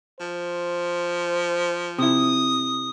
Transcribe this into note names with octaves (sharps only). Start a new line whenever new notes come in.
F3 C5
C3 E4 D#6